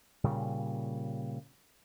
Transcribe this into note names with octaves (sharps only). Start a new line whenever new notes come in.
A#2 C#3 G3